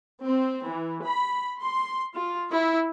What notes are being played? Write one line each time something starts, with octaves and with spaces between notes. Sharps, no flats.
C4
E3
B5
C6
F4
E4